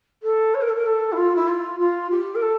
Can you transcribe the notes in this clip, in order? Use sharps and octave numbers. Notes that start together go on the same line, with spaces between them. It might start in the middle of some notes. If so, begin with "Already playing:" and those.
A4
C#5
A#4
A4
A#4
A4
E4
F4
E4
F4
F4
G4
A#4
A4